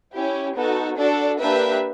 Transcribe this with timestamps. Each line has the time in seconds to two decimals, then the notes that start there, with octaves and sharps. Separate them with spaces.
0.13 C#4 E4 G4
0.55 B3 D#4 F#4 A4
0.97 D4 F#4 A4 D5
1.39 A#3 D4 G4 B4 E5